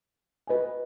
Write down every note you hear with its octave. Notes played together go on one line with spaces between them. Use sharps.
F#4 B4 D#5 G#5